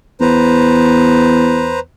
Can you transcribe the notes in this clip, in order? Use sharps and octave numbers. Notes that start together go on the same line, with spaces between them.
E2 B4 C5 A#5